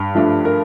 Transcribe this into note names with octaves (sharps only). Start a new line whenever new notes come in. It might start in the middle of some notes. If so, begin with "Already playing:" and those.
Already playing: G2
F3 A3 D4
A#4